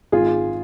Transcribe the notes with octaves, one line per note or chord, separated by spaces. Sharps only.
G#1 F4 G#4